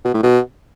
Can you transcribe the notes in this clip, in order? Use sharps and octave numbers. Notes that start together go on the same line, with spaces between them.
B2
A2
B2